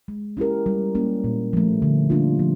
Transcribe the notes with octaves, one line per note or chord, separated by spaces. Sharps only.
G#3
C#4 E4 G4 A#4
G3
A#3 C#4
A#2
F3 A3
D3
G3 A#3 D4 F4
F3